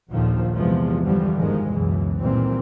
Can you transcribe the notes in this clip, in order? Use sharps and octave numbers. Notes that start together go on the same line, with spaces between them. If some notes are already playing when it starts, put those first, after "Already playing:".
A#1 D#2 A#2 D3 D#3 F3
E2 C3 F3 G#3
G2 D3 E3 F3 G3
G1 G#2 D#3 F3 G#3
C#2 F#2 B2 E3
A#2 D#3 E3 G3 C4